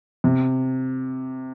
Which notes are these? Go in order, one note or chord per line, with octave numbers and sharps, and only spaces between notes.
C3